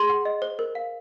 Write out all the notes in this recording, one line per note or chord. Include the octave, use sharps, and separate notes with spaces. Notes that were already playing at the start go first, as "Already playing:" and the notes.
Already playing: G#4 C6
F#5
D#5
C5
A#4
F5